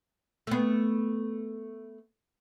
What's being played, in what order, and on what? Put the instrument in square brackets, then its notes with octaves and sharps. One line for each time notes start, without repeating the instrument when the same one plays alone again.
[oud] A3 B3